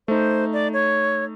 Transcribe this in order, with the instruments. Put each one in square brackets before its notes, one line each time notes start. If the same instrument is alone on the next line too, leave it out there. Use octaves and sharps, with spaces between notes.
[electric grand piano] A3 D#4 [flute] C5
[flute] D5
C#5